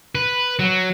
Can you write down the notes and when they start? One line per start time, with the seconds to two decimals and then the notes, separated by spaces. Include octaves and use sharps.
0.15 B4
0.59 F#3